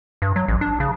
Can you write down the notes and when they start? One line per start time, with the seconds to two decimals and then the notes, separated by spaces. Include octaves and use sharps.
0.22 G2
0.36 F#3
0.48 A1
0.61 D4
0.80 C#3